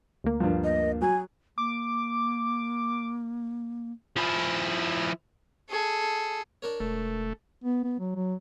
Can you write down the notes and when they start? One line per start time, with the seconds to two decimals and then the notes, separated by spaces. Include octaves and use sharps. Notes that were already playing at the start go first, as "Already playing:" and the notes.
0.24 D2 A#3
0.40 G2 F3
0.64 D#5
1.02 F#3 G#5
1.58 A#3 D6
4.17 F3 E4
5.70 G#4 A4
6.62 D4 A#4 C#5
6.80 E1 A3
7.64 B3
7.83 B3
7.99 F#3
8.15 F#3